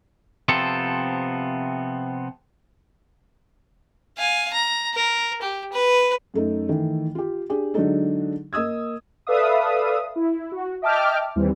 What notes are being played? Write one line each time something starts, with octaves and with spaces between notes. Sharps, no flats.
C3 F3 B3 C4 A4
F5 G#5
A#5
A#4
G4
B4
F#2 A3 D#4
D#3 E3 A3
F4 G4
D4 G4 G#4
D3 F#3 G#3 D4 D#4 A4
A#3 D#5 D#6 E6 G#6
A4 B4 D5 E5 F5 D#6
E4
F#4
D#5 E5 G5 A5 D6 F6
D#2 E3 G3 C4